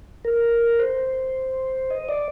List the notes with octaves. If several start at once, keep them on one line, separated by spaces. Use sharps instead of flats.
A#4
C5
D#5
D5